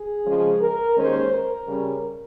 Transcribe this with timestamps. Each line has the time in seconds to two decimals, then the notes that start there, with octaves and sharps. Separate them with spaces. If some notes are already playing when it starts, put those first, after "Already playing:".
Already playing: G#4
0.26 C#3 F3 G#3 C#4
0.61 A#4
0.96 D#2 D#3 G#3 C#4 C5
1.31 A#4
1.66 C#3 G3 C#4